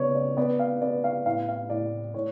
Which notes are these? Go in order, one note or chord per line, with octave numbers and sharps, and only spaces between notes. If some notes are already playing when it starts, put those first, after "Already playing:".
Already playing: C#3 B3 C#5 D5
D5
B3 D5
F5
B3 D5
F5
A2 F5
F5
A2 D5
A2 C#5